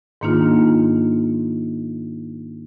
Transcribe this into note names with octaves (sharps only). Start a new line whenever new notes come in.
G#2 D#3 A#3 D4 D#4 F4